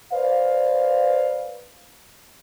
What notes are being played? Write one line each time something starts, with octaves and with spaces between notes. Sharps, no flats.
B4 C5 D5 F5